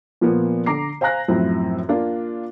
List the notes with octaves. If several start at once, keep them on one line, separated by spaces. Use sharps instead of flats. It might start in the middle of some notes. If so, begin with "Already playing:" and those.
A#2 F3 A#3 B3
D3 A#5 D6 C7
C5 F5 G#5 A#5 F#6 A#6
F#2 A2 F3 C4 E4
A#3 D4 F4